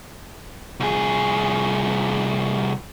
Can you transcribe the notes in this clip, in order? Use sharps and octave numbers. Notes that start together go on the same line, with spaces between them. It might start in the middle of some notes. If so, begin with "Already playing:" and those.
C2 G#4